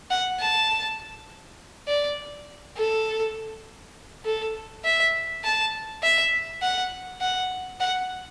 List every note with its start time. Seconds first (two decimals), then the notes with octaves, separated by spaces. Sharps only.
0.10 F#5
0.40 A5
1.88 D5
2.77 A4
4.25 A4
4.84 E5
5.44 A5
6.03 E5
6.62 F#5
7.21 F#5
7.80 F#5